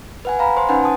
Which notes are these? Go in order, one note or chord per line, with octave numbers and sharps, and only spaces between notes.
B4 F#5 G#5
F5 A#5 B5
C5 C6
C#4 D#4 B4 F#5 G#5
A5 D#6